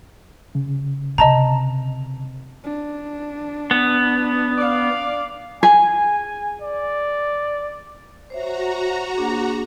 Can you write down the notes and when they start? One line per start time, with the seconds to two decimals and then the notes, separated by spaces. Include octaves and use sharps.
0.55 C#3
1.18 C3 D#5 A5 A#5
2.64 D4
3.71 B3
4.58 D5 F5
5.63 G#4 G#5
6.62 D5
8.30 F#4 C5 C#5 E5 A#5
9.16 A#3 D4 G#4